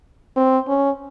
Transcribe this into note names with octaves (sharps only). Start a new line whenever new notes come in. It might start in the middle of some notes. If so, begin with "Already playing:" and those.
C4
C#4